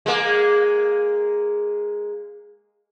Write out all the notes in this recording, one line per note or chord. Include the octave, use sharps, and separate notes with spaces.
G#3 A#3